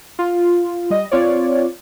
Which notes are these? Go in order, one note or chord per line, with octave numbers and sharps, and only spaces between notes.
F4
G3 D#5
C4 F4 C#5 D5